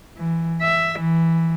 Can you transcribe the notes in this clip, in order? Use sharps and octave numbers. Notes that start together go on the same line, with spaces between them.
E3
E5
E3